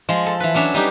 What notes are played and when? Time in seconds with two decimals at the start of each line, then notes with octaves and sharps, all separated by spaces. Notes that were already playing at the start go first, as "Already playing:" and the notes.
0.09 F3 G#3
0.26 A4
0.40 E3 B4
0.54 F#3 C#4 D4 E5
0.74 G3 D#4 G4 B4